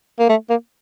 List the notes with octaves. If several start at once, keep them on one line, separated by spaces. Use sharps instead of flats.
A#3
A3
A#3